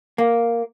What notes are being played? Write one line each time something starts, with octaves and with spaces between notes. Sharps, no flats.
A#3